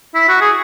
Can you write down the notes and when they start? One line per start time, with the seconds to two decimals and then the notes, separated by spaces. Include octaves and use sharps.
0.15 E4
0.29 F#4
0.41 G#4